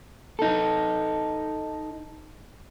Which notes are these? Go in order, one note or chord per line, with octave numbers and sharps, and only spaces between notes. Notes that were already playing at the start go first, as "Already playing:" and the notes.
D#4 A4